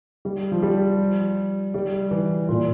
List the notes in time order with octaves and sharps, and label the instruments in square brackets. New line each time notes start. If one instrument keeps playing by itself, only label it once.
[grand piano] G3
F3
G3
G3
E3
A#2